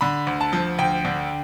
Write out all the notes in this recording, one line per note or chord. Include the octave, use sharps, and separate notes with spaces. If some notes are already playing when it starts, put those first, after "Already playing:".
D3 B5
D2
A5
F3
D2 G5
D3